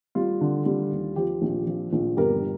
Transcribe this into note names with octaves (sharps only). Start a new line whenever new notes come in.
G3 F4
D3
G3
D#2
F3 G4
A#1
F3
A#1
G1 G4 A#4